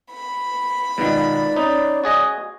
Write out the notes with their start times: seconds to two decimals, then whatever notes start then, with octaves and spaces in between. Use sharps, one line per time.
0.12 B5
0.98 B2 D#3 G#3 D#4 F4 D5
1.56 C#4 D#4
2.04 F#4 G#4 D#5